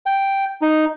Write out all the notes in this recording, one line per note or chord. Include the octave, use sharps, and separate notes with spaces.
G5
D#4